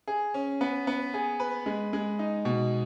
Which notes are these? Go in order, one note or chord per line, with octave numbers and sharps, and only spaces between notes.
G#4
C#4
B3
B3
G#4
B4
G#3
G#3
D#4
B2